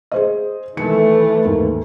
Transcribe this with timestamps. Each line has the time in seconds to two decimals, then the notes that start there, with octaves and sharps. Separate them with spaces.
0.12 G#4 C5 D#5
0.77 D#3 E3 A3 C#7
1.45 D#2 G#2